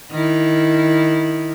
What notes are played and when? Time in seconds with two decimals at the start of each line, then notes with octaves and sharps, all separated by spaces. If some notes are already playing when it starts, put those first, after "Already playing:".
0.11 D#3 E4